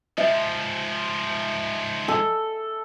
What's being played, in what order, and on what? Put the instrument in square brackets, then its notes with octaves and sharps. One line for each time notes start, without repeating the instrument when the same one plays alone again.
[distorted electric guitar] G#2 F3 [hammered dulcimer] E5
[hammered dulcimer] A4